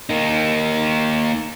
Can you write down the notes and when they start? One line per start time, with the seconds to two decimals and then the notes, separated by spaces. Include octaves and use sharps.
0.10 A#3 D#4